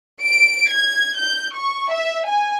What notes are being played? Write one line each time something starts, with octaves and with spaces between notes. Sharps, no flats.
D7
G#6
G6
C#6
E5
G#5